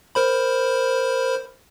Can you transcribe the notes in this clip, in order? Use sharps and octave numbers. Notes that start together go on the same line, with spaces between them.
A#4 C5 B5